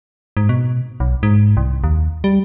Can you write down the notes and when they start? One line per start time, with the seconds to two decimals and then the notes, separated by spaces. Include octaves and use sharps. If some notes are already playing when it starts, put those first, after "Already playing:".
0.37 G#2
0.49 B2
1.00 B1
1.23 G#2
1.57 C2
1.84 D#2
2.24 G3